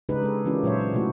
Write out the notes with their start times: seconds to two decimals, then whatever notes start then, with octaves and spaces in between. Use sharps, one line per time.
0.09 C#3 G#3 D4 D#4 G4 B4
0.22 G#3 G#4 A4
0.45 E3 A#3 C#4 D4 F4 G4
0.63 A#2 F#3 G#3 C5 C#5 E5
0.80 D4
0.93 C3 A3 E4 F#4